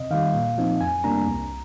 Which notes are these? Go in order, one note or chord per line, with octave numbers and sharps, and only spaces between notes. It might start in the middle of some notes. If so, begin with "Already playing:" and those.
Already playing: C3 D#5
D#3 G3 F5
A#2
F3 C4 D#4
F2 G#5
C3 G3 A#3 D4 A#5
C2